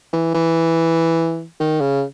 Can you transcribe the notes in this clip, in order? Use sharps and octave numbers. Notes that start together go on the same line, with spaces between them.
E3
E3
D#3
C#3